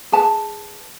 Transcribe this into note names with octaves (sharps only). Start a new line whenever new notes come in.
G#4 B4 A5